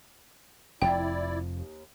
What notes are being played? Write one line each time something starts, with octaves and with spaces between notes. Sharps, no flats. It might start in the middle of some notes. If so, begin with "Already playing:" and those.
F1 F2 F3 E4 D5 G5
D#2